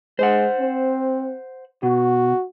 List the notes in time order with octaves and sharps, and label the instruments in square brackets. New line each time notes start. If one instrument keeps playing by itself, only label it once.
[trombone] G#3 [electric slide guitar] C5 F#5
[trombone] C4
[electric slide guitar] B2 [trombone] F#4